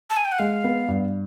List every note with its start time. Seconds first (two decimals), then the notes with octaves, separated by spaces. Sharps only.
0.10 A5
0.17 G#5
0.25 G5
0.32 F#5
0.39 G#3 F5
0.64 B3
0.88 G2